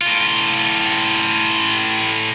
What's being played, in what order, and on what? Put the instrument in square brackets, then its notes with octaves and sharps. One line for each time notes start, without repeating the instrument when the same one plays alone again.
[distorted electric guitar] A2 F4